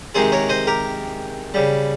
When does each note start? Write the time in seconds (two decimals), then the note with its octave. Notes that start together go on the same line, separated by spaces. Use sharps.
0.15 C3 D#3 G#3 G#4 C5
0.32 A#4 C#5
0.49 C5 D#5
0.67 G4 A#4
1.54 C#3 G3